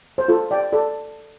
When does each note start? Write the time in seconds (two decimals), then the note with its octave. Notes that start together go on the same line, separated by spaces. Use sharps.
0.18 C5
0.28 F4 A4
0.51 D5 G5
0.72 A4 D5